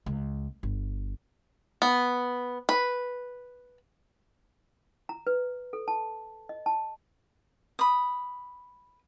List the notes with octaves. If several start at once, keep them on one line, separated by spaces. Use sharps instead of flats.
C#2
G1
B3
B4
A#5
B4
A4
A5
D#5
A5
B5 D#6